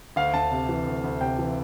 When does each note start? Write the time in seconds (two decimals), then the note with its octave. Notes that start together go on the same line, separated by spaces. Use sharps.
0.16 D2 F5
0.34 D2 A5
0.51 C3
0.69 E3
0.86 D2
1.04 D2
1.21 C3 G5
1.38 E3